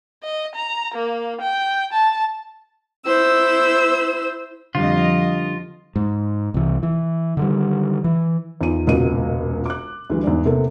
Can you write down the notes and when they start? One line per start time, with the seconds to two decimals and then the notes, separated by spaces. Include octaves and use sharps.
0.23 D#5
0.55 A#5
0.94 A#3
1.41 G5
1.92 A5
3.04 E4 C5 E6
4.75 F2 D3 G3 F4 D#5
5.96 G#2
6.54 C2 E3
6.83 E3
7.37 D3 D#3 G3
8.04 E3
8.61 E2 D#3 F4 D#7
8.87 E1 C#2 A#2 F#4 D#5 D#7
9.66 D6 F#6
10.10 D2 E3 G3
10.24 E2 G#2 D5
10.45 C3 A#3 B3 A4